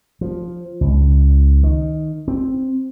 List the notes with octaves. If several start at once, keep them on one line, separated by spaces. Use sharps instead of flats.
F3
C#2
D#3
C4